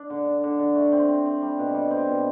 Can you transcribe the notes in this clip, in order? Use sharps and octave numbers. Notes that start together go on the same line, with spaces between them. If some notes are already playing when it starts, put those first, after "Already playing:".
Already playing: D4
D3
D4
D3
D3
A3
C4
C4
C4
G3
B2
G3
C4
B2